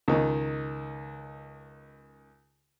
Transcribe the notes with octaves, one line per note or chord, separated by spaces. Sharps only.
C#2 D#3